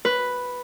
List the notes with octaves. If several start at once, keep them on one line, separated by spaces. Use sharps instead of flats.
B4